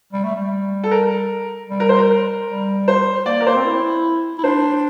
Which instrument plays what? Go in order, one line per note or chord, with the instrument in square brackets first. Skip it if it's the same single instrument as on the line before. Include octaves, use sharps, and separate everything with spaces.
[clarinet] G3
A3
G3
[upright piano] A4
A#4
[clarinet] G3
[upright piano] A#4
C5
A#4
[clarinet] G3
[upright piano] C5
[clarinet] A#3 [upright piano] D5
[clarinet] A#3
[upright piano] A#4
[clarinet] A#3 [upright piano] C5
[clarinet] C4
E4
E4
[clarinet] D4 [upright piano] C5